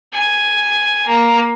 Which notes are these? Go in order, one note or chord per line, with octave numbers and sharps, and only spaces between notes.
G#5
A#3